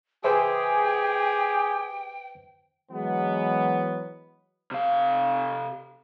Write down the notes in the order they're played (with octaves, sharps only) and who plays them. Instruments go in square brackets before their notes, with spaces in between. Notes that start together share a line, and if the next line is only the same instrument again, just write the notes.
[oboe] G4 [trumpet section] G#4 [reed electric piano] B4 C5 E5 [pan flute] G5
[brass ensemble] E3 F#3 G#3 B3
[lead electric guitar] C3 F5